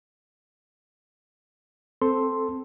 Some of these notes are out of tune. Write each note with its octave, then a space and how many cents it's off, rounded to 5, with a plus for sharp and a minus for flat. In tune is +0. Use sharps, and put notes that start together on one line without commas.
C4 +0 A4 +0 C6 +0